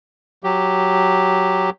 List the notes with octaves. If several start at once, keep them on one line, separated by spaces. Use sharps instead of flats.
F#3 G4